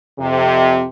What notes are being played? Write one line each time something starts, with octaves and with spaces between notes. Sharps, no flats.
F2 C3